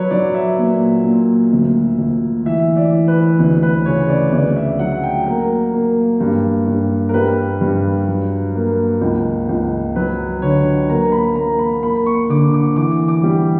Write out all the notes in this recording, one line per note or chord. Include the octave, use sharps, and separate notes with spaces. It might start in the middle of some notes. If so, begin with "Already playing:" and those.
Already playing: F#3 B4 C#5
F#3 D5
E5
A#2
A#2
D2
D2
E3 E5
D5
E3
B4
D2
B4
C#3 C#5
D5
D2 D5
E5
F#3 F#5
G5
A#3 A#4
A#3
G2
G2
A#4
G3 B4
G2
F#3
A#3
C#2
C#2
F#3 B4
D3 C#5
A#3 A#5
B5
A#3 A#5
B5
A#3 B5
C#6
D3 D6
D6
E3 D6
D6
G3